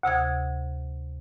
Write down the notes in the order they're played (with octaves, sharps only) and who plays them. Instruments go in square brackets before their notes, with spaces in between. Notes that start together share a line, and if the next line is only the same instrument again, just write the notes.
[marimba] D2 C3 D#6 G#6